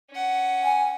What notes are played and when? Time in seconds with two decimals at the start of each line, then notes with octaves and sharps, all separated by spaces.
0.11 C#4 F#5
0.64 G#5